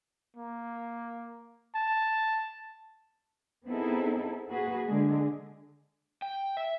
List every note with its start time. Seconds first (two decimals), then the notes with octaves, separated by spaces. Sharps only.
0.36 A#3
1.75 A5
3.66 B3 C4 D#4 E4 G#4 A4
4.51 A#3 F#4 G#4 B4
4.85 D3 G#3 G#4
6.22 G5
6.57 E5